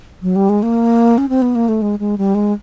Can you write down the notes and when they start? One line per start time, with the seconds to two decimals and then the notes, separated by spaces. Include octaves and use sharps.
0.22 F#3
0.36 G3
0.49 G#3
0.63 A#3
1.18 C#4
1.29 C4
1.42 B3
1.55 A#3
1.69 A3
1.82 G#3
1.99 G#3
2.18 G3
2.35 G#3